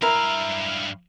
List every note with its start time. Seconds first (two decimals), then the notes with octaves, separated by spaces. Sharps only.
0.02 G2 E4 A#4 E5 F5